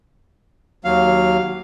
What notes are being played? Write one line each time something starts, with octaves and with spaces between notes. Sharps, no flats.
D#2 F#3 F5